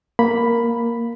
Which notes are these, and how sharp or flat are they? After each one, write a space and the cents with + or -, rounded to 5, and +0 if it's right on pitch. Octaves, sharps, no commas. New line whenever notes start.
A#3 +0 B5 +0